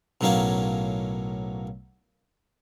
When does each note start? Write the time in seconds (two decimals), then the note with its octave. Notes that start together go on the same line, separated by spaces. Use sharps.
0.21 B1 A2 F#3 A#3 C#4 F5